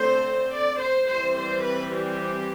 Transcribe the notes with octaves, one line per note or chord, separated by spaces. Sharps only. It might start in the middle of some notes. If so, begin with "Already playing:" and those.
Already playing: D3 A3 C4 C5
D5
C5
E3 G3 C4 C5
C5
B4
G4